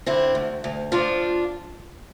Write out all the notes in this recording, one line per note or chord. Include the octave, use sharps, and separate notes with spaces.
D3 C4 E4
D2
D2
F3 D4 F4